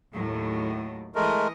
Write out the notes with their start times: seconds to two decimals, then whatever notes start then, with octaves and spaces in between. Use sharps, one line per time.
0.13 D#2 A2 F#3
1.15 E3 G#3 A3 A#4 D#5